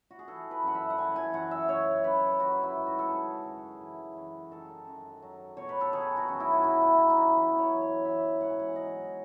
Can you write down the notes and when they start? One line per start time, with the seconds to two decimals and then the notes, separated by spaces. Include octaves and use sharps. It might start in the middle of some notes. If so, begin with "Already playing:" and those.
0.11 F#4
0.19 G#4
0.27 E3 A4
0.51 B4
0.63 F#2 F#5
0.75 E5
0.90 F#5
0.98 E3 G#5
1.16 G#5
1.33 F#2 F#5
1.51 E5
1.69 C#3 C#5
2.04 F#2 B4
2.39 D#3 F#4
2.63 E4
2.75 G#2
2.86 F#4
2.99 A4
3.10 C#3 G#4
3.46 F#2
3.81 E3
4.17 F#2
4.51 D#3 A4
4.87 F#2
5.22 F#3
5.57 B2 C#5
5.69 B4
5.81 A4
5.93 D#3 G#4
6.17 F#4
6.29 F#2
6.40 E4
6.53 F#4
6.64 F#3 E4
6.81 E4
6.99 B2 D#4
7.10 D#4
7.17 E4
7.34 E3 B4
7.58 C#5
7.70 F#2
7.81 C#5
8.05 E3 E5
8.41 G#2 F#5
8.50 G#5
8.60 F#5
8.76 F#3 D#5